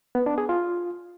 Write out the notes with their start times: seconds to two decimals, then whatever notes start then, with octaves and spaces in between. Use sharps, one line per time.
0.15 B3
0.26 D4
0.38 G#4
0.49 F4